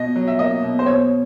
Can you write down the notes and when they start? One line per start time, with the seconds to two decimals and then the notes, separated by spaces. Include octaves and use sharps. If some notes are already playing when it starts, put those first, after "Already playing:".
Already playing: B2 D#5
0.16 F#3
0.28 E5
0.39 A#3 D#5
0.63 B2
0.79 C5
0.86 B2 C#5